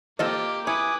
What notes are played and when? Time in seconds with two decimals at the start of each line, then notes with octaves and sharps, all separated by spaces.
0.19 A#3 C4 F4 G4 A4 D#5
0.67 E4 B4 C#5 G#5 D6 D#6